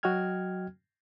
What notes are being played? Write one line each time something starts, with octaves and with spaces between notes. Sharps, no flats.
F#3 F#4 D#5 G5 F6 G#6